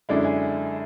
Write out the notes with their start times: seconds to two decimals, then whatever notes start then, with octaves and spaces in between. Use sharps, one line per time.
0.09 F#2 D3 G#3 D4 E4
0.24 G#4